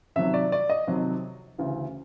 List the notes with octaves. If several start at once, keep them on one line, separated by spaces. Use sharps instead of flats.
F2 C3 D#3 F#3 E5
D5
D5
D#5
F2 C3 D#3 F#3
D2 C#3 E3